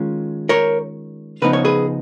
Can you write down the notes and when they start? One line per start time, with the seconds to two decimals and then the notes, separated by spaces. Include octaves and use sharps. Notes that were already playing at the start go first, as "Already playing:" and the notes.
Already playing: D#3 G#3 C#4 F4
0.49 A#4 C#5
1.42 C#3 F3 B3 D#4 B4
1.53 C#5
1.65 G#4 B4